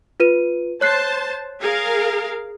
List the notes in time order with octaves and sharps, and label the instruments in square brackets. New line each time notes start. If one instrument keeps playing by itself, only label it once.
[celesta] F4 B4 D#7
[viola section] C5 A5 [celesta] C#5 F#6 C7
[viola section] G#4 A#4 F5